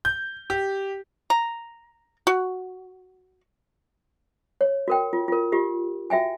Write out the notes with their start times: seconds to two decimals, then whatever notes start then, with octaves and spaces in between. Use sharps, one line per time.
0.05 G6
0.50 G4
1.30 A#5
2.27 F#4
4.61 C#5
4.88 F#4 A#4 G5
5.13 F4
5.28 F4 A#4
5.52 F4 G4
6.10 F#4 E5 G5 G#5